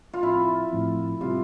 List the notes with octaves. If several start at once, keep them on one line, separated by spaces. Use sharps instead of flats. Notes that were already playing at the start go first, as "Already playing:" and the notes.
F4
A2 F3 C4 E4
A2 F3 C4
C3 G3 C4 F4 G4